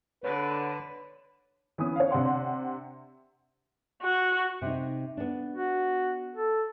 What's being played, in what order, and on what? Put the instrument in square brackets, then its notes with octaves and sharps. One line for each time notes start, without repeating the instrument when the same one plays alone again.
[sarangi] D3 [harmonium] B4 [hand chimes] C#5
[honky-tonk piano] E3 B3 C#4 D#6
C#5 F5
C3 D4 F#5 C6
[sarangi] F#4
[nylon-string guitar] C3 D#4
B3 D4
[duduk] F#4
A4